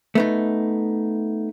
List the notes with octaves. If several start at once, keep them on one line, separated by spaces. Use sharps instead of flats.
A3 B3 D#4